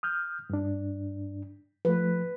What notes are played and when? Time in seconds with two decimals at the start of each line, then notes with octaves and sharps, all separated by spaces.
0.03 D#6 F6 G6
0.50 G2 D4
1.85 F3 A3 B4